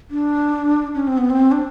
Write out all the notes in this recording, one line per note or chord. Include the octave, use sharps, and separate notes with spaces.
D4
C#4
C4
B3
C4
D4